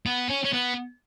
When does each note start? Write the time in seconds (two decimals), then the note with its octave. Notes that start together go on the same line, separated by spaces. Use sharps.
0.06 B3
0.29 C#4
0.44 C#4
0.53 B3